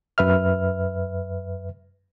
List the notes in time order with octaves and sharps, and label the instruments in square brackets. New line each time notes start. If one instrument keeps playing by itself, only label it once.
[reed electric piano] F#2 B4 E5 F6